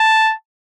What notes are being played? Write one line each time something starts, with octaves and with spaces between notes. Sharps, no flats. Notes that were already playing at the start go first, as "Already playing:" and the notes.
Already playing: A5